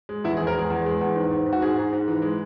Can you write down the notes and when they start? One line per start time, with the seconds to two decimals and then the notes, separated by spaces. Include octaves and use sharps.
0.09 G#3
0.24 E2 E4
0.37 G#4
0.40 E2
0.47 A#4
0.55 G#3 G#4
0.70 E2
0.86 G#3
1.01 E2
1.16 G#2
1.31 G#2
1.46 G#2
1.53 F#4
1.62 G#2 G#4
1.77 G#2
1.93 G#2
2.08 E3
2.22 G#3